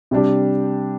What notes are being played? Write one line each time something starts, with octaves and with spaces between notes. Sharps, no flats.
C3 G3 D4 G4